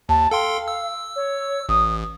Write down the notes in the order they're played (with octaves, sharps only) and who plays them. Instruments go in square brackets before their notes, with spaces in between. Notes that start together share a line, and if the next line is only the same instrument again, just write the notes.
[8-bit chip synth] D#2 [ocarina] A5
[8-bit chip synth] A4 G5 C6 [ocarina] F5
[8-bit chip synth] E6
[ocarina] C#5
[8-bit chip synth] A1 [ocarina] D#6